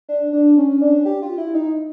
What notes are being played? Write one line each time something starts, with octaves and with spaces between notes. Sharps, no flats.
D4
D4
C#4
D4
G4
F4
E4
D#4